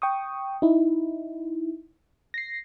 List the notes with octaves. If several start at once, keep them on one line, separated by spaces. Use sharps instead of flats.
G5 C#6 D#6
D#4 E4
A#6 C7